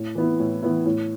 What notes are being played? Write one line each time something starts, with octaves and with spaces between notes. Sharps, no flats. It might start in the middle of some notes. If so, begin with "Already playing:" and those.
Already playing: A2
E3 B3 E4
A2
E3 B3 E4
A2